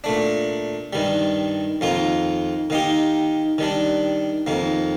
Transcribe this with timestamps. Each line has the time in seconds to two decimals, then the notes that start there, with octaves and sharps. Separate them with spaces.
0.04 A#2 A3 D4
0.93 G2 D#3 G3
1.81 F2 D#3 A#3 F4
2.70 D#3 A#3 D#4 G4
3.58 D#3 G3 D4
4.47 F2 D#3 A#3